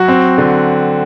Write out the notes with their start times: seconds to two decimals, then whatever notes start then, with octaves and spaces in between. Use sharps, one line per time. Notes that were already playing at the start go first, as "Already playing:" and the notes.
Already playing: F#3 F#4
0.08 C4
0.38 D3